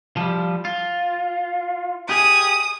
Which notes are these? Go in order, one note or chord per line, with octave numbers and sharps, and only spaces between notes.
F3 G3
F4
G4 G#4 D#6